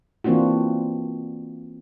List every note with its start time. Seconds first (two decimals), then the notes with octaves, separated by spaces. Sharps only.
0.24 E3 A#3 C4 D4 F4 F#4